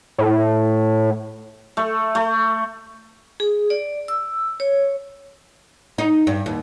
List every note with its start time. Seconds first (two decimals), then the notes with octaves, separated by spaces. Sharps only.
0.18 A2
1.77 A3
2.15 A3
3.40 G#4
3.70 D5
4.08 E6
4.60 C#5
5.98 D#4
6.27 G2
6.46 D#2